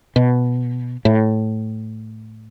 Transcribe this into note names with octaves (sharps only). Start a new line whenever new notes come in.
B2
A2